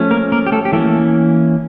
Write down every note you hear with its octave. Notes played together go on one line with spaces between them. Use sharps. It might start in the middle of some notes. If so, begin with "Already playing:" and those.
Already playing: F3 A3 C#4
A#3 A#4
A#3 A#4
G4
A3 A4
G4
E3 A3 A#3 C#4 A4